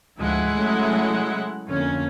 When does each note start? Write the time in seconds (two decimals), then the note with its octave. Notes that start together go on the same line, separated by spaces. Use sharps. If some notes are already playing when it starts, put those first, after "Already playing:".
0.19 D2 G#2 F3 G#3 E4 F#5
0.54 C#3 F#3 A3
1.68 F2 D3 A#3 C#4